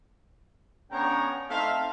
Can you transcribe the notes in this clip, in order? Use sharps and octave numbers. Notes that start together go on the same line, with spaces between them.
C#3 B3 D4 C#5 G5 A#5
A3 C4 D#4 E5 F5